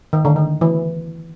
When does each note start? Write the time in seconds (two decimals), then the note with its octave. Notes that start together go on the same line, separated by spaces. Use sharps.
0.13 D#3
0.25 D3
0.36 D#3
0.61 E3